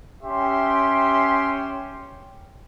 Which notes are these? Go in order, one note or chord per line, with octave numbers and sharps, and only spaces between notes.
C#4 G4 E5 G5 C6